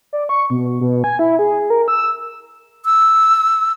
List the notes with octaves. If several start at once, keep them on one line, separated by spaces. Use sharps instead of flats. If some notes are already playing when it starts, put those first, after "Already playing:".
D5
C#6
B2
B2
G#5
E4
G#4
A#4
E6
E6